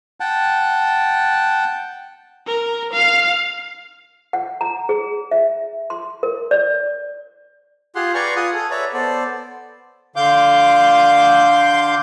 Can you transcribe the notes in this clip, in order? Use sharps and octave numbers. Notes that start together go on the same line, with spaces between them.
F#5 G5 A5
A#4
F5
F#5
A#5
G#4
E5
C6
A#4
D5
F4 G4 G#4 F#5 C6
B4 D5 G#5 A#5 C6 C#6
F4 G#4 F#5 D#6
G#4 A4
B4 C#5 D5 E5 A#5
B3 A4 C5 D5
D3 F5 C6 D6 G6